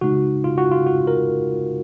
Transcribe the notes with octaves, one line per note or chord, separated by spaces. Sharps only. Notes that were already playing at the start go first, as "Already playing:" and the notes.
C#3 G#3 D#4 F#4
F4
F#4
F4
F#4
A#4